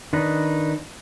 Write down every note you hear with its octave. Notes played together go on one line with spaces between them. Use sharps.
D#3 D4 D#4 B4 D#5